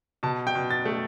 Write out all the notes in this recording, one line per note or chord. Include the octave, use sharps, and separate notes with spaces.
B2 A5
G5
B2
A6
A3